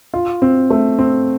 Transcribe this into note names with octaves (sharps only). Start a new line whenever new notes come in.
F4
C4
A3
C4